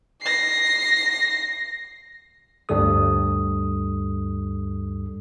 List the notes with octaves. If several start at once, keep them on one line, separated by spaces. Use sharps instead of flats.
A#6 C7
D2 G2 G3 A4 D#6